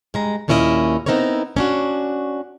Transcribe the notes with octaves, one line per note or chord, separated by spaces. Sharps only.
G2 G#3 A#5
D#2 A#2 C#4 E4 G4 D#5
B3 C4 D#4 E4 A#4 C#5
C#4 D4 F#4